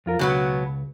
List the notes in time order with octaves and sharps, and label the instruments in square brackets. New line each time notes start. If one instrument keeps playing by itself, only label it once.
[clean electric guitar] F2 F4 A#4
[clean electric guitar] C#2 [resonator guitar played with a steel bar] B2 F#3 B3